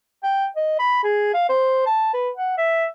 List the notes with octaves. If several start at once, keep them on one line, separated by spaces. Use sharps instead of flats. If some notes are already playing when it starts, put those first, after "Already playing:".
G5
D#5
B5
G#4
F5
C5
A5
B4
F#5
E5